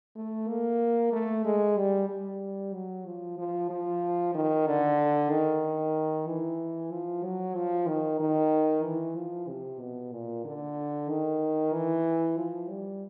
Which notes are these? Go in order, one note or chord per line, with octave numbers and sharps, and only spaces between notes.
A3
A#3
A3
G#3
G3
G3
F#3
F3
F3
F3
D#3
D3
D#3
E3
F3
F#3
F3
D#3
D#3
E3
F3
C3
B2
A#2
D3
D#3
E3
F3
G3